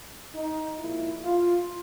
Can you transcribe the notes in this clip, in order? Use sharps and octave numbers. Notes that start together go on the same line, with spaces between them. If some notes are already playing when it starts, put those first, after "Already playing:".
D#4
A#2 F3 G#3 E4
F4